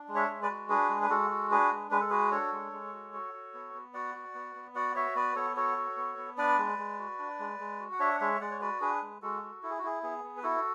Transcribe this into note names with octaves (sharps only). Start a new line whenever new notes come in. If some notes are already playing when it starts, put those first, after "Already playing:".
Already playing: D4
G#3
C#5 E5
G#3
B4 D5
F#4
D4 G#4 B4
G#3
B4
G#3 F#4 A4
F#4
D4 G#4 B4
G#3
G#3 B4
A4
F#4 G#4 B4
D4 A4 C#5
G#3
G#3
F#4
F#4
F#4
B3
B3
F#4 D5 F#5
F#4
B3
B3
F#4 D5 F#5
F#4 C#5 E5
B3 B4 D5
B3 A4 C#5
F#4 A4 C#5
F#4
B3
B3
D4 B4 D5
G#3
G#3
F#4
D4
G#3
G#3
F#4
F#5
D4 C#5 E5
F#5
G#3 C#5 E5
G#3 D5 F#5
C#5
F#4 B4 D5
D4 G#4 B4
G#3
G#3 F#4 A4
F#4
E4 A4
G#4
F#4
E4 G#4
B3 G#4
B3
B4
E4 F#4 A4